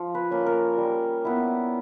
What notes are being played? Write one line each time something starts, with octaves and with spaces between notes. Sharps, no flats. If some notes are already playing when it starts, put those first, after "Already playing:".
Already playing: F3
B4
A#3 C#4
A#4
G3
B3 E4